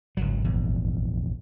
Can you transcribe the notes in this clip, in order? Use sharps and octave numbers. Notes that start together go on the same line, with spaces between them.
G#1 C#2 F#3
A#1 E2